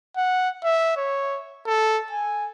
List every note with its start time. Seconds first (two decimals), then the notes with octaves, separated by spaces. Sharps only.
0.17 F#5
0.64 E5
0.97 C#5
1.66 A4
2.11 G#5